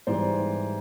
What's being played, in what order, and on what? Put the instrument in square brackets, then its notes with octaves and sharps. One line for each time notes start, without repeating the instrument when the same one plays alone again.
[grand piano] G#2 E3 G3 C5 D5